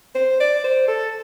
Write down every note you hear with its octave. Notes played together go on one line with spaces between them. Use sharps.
C5
D5
C5
A4